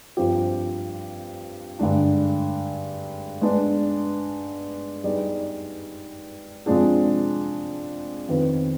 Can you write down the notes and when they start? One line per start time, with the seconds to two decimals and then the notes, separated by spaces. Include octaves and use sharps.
0.17 G2 F3 C4 G4
1.79 G2 D3 G#3 D4
3.41 G#3 B3 D4
5.04 G3 B3 D#4 G#4 D5
6.66 C3 F3 G#3 D4 G#4
8.28 F2 D#3 B3 F4 B4